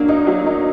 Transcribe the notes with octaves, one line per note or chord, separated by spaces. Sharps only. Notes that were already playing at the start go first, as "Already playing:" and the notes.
Already playing: F#3 A#3 D4
D#4
F#3
D#4